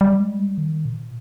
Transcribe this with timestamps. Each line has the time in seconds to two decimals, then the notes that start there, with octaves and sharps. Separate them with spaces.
0.01 G3
0.20 G#3
0.39 G3
0.58 D#3
0.85 A#2